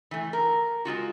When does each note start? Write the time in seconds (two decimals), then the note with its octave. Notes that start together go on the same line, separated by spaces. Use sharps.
0.11 E3 A3
0.33 A#4
0.85 G#3 C4 F4 F#4